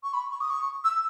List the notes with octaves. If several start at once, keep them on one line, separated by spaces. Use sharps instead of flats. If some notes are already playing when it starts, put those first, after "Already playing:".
C#6
B5
C#6
D#6
C#6
E6